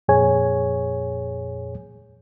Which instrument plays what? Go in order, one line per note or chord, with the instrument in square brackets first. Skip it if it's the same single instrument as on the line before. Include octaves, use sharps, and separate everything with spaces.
[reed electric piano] F2 A#2 G#4 C#5 G#5